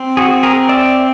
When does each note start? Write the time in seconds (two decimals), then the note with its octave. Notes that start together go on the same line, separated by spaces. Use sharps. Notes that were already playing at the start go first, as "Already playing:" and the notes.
Already playing: C4
0.17 F#4 G#4
0.43 G#4 A#4
0.69 D5 E5